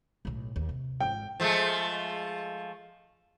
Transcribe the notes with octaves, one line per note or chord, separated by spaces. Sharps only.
B1 A2
D#2
C3
G#1 G5
F3 G#3 A3